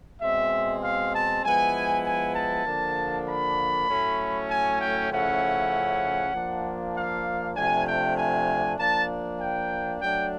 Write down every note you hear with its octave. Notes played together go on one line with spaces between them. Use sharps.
B2 G#3 C4 E5
F5
A5
F3 G#3 B3 E4 G#5
G#5
A5
D3 F3 A#3 D4
B5
A2 F#3 A3 C#4
G#5
G5
C#3 F3 A3 C#4 E4 F#5
F3 A#3 D4
F5
C3 F3 A3 D4 G#5
G5
G#5
F3 A#3 D4 A5
G5
F#3 A3 D4 G5